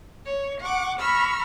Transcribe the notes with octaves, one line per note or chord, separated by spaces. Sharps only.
C#5
F#5 C#6 D6
A#5 B5 C#6 E6 F6